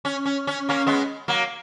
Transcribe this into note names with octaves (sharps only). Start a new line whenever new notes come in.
C#4
C#4
C#4
A#3 C#4
G#3 B3
F#3 A#3